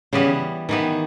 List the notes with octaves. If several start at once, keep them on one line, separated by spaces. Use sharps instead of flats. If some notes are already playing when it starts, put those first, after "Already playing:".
C#3 E3 G3 B3
D#3 E3 G3 B3